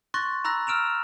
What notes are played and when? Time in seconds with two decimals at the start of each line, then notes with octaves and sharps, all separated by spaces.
0.14 C6 C#6 F#6 A6 A#6
0.44 A#5 B5 E6 F#6 A#6
0.67 E6 F6 D7 E7 F7